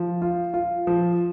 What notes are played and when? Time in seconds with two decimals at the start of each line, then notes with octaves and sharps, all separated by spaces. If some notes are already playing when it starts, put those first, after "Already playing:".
Already playing: F3
0.22 F4
0.54 F4
0.87 F3